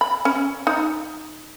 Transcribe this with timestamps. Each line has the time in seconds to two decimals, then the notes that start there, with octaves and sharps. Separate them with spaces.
0.01 B5
0.25 C#4
0.67 D#4